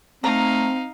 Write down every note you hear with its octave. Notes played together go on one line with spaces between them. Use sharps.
A3 C4 D#4 F5 A#5